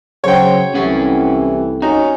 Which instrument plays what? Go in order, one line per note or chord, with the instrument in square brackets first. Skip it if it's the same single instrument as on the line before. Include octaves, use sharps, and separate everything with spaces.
[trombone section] C#3 F#3 [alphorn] C5 [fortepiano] C#5 G5
[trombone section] C2 A3 G4 [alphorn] E3 [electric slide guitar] C#4 F#5
[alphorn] C#4 [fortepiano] D#4 [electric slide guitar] F#4